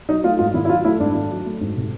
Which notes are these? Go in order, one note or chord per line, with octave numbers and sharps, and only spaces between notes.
F#3 D#4
A3 F4
G#2 F4
D#3 E4
E4
F#3 F4
A3 E4
G#2 D4
D#3
F#3
A3
G#2
C3